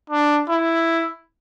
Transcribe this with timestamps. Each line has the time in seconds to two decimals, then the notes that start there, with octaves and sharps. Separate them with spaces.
0.10 D4
0.49 E4